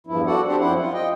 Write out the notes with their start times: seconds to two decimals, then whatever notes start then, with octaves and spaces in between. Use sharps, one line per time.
0.07 E2 G2 F3 E4
0.26 F#4 A4 D5 F#5
0.47 C4 D4 G4 C5 D5
0.60 F#2 F3 E4 C5 F#5
0.79 F4
0.93 D#5 G5